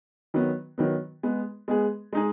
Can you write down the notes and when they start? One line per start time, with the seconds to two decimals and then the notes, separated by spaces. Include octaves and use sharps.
0.34 D#3 F#3 B3
0.78 D#3 F#3 B3
1.23 G#3 B3 G#4
1.68 G#3 B3 G#4
2.13 G#3 D#4 G#4